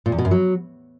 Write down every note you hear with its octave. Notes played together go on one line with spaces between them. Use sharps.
A#2
E2
B2
F#2
F#3